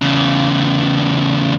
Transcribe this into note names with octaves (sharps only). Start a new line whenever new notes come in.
E2 C#3